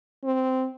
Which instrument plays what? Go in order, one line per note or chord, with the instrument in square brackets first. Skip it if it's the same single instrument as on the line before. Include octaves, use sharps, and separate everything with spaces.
[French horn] C4